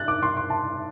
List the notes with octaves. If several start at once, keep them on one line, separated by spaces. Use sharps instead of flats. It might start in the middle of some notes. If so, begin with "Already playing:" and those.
Already playing: G2 F#6 A6
D6
C6
C6
A5